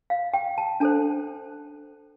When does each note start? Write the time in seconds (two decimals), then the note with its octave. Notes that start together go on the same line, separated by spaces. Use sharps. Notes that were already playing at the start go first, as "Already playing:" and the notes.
0.10 F5
0.34 G5
0.58 A5
0.80 D4 A4 C5 A5